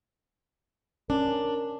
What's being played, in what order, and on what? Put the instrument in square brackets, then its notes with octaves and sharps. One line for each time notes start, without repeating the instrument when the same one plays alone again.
[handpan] C#4 [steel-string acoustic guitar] D4 [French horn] A#4